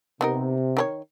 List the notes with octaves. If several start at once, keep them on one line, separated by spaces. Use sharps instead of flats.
C3 B3 D#4 A#4
D#3 D4 C#5